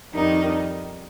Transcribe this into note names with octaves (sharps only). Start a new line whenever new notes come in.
F2 D#3 G3 D#4